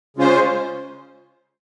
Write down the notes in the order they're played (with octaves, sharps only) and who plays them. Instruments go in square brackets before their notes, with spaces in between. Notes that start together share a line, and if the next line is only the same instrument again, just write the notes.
[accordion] C#3 G#3 C#4 F4 C5